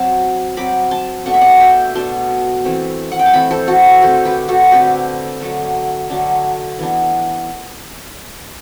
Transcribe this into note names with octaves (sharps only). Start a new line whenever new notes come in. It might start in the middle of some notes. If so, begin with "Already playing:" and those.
Already playing: F#3 C4 A5
F#3 C4 B5 D6
A5 C6
B2 A3 D4 F#5
E5
D5 F#5
E5 G5
B2 A3 D4 A5 C6
E3 A3 C4
F#5
G5
A5
E3 A3 C4 G5 B5
A4 C5
F#4 A4
D3 A3 C4 A4 C5
G4 B4
F#4 A4
D3 A3 C4 G4 B4
D3 F#3 A3 D4
D3 F#3 A3 D4
E3 B3 D4